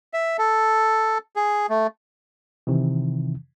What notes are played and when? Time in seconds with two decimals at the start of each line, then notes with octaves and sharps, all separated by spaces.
0.13 E5
0.38 A4
1.36 G#4
1.69 A3
2.67 C3 D#3 E3